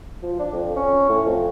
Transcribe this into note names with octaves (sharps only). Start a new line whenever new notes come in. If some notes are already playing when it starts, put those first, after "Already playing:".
F3
D4
F2
C#4
A2
F2